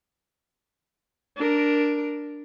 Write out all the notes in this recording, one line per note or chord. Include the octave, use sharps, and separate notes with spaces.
D4 A#4